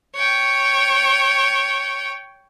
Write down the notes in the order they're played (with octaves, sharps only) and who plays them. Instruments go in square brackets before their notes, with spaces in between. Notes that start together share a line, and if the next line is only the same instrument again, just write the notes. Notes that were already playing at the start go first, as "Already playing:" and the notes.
[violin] C#5 G5